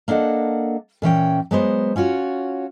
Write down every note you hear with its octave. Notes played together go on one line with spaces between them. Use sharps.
A#3 D4 A4 D#5 F#5
A#2 E3 C#4 G5
F#3 G#3 B3 C5
C#4 F4 F#4 C#5